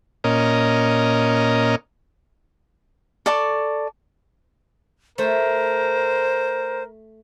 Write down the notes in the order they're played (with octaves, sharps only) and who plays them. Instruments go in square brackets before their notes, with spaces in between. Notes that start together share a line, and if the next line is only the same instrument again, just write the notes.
[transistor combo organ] A#2 C#4 A#4 D#5
[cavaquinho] A4 D5 A5 C#6
[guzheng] A3 [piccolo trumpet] A#4 [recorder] C5